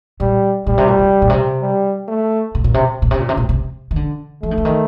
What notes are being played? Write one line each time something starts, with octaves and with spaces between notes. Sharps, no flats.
A#2 G3
A#2 G3
C3
A#2
C3
A#2
C3
G3
A3
C3
A#2
C3
A#2
C3
A#2
C3
A#2
C3
D#3
D3
F3 A3
D#3
D3
D#3